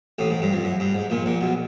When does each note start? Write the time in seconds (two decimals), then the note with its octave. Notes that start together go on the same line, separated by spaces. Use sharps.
0.19 A1 A2
0.30 G#2
0.42 G2
0.53 F2
0.64 F#2
0.80 G2
0.94 G#2
1.10 A#1 A#2
1.26 A#1 A#2
1.41 B1 B2